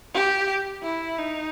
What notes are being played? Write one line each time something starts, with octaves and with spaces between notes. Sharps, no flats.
G4
E4
D#4